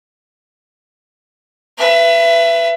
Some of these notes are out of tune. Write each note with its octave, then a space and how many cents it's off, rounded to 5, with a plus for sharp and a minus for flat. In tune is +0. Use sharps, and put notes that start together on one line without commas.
B4 +0 E5 +30